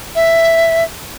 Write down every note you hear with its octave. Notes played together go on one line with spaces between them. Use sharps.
E5